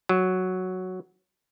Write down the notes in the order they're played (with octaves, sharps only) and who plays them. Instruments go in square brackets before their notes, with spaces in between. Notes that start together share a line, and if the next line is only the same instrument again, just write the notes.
[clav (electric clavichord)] F#3